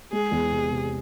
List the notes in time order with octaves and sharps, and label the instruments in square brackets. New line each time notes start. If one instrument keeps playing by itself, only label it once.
[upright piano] G#3 [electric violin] G#4
[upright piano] E2
C3
C3